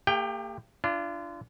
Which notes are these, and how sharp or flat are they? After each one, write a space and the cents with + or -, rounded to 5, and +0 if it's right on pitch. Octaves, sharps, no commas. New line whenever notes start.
A#3 -45 G4 +35 G5 -5
D4 +0 F4 -35